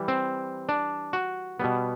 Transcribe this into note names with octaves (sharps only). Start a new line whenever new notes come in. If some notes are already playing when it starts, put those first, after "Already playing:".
Already playing: E3 G3
C4
D4
F#4
B2 G3 B3